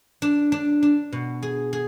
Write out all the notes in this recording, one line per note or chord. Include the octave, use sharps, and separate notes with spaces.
D4
D4
D4
B2
G#4
G#4